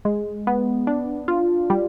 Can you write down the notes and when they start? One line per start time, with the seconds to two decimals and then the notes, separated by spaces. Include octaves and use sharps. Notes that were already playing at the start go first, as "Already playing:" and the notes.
0.05 G#3
0.47 B3
0.87 D4
1.28 F4
1.70 G3